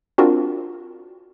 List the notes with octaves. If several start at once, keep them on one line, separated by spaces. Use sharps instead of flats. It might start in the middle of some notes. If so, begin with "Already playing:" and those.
C4 D4 F4 F#4 A#4